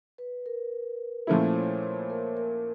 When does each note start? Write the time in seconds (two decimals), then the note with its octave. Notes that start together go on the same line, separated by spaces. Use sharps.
0.18 B4
0.46 A#4
1.27 A#2 F3 A3 C#4 E4 C5
1.56 C#5
1.82 C5
2.10 A#4
2.37 A#4